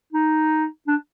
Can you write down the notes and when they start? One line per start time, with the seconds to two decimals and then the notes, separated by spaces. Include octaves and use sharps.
0.13 D#4
0.88 D4